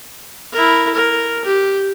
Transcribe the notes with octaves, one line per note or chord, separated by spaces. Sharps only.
E4 A#4
A#4
G4